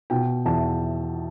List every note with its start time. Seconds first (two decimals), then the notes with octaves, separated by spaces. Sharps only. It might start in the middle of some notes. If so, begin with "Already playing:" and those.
0.10 B2 G5
0.45 E2 A5